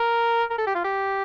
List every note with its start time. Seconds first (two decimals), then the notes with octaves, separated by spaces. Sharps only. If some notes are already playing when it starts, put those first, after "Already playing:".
Already playing: A#4
0.50 A#4
0.58 A4
0.66 G4
0.75 F4
0.84 G4